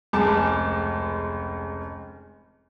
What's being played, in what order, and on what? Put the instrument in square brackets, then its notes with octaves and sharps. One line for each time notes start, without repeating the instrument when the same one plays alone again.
[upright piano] F1 C#2 G#3 A5 D6